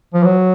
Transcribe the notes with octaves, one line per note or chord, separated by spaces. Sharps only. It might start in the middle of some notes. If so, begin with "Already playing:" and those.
F3
F#3